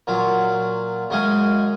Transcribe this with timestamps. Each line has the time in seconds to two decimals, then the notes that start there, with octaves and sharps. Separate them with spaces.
0.07 A#2 F#3 F4
1.10 F#2 G#3 D#5 F5 G#5